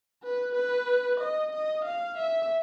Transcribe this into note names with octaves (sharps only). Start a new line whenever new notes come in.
B4
B4
D#5
D#5
F5
E5